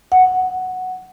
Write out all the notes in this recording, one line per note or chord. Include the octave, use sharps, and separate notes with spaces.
F#5